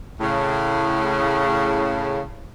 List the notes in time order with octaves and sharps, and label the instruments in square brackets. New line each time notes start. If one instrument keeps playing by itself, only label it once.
[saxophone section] A2 C#3